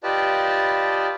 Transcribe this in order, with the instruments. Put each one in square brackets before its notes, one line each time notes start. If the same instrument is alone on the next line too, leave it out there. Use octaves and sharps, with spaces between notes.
[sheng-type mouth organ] F4 G4 B4 D5 D#5 A5